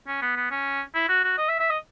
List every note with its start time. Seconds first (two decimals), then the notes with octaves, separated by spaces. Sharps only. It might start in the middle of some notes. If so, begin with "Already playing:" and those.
0.08 C#4
0.22 B3
0.36 B3
0.51 C#4
0.95 E4
1.09 F#4
1.24 F#4
1.38 D#5
1.49 E5
1.60 E5
1.70 D#5